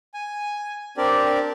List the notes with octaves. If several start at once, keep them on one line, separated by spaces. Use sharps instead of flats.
G#5
C4 D4 G4 A#4 D5